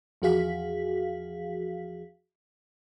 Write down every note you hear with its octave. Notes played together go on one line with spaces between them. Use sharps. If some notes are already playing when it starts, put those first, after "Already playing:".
E2 F3 F#4 G#4 F5 B6